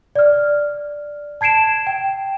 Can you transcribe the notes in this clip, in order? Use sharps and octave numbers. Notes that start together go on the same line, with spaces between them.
D5 F6
A5 G#6 C7 D7 E7
G5